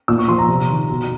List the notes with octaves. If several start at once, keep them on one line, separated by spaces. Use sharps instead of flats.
A#2 E6
C#6
F3 C6
A#5
C3
D#3
B2